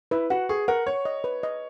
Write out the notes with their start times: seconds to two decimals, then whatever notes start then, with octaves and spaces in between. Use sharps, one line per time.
0.11 E4 B4
0.30 F#4 F#5
0.49 G#4 C#6
0.68 A#4 F#5
0.86 C#5 C#6
1.05 D#5
1.24 B4
1.43 D#5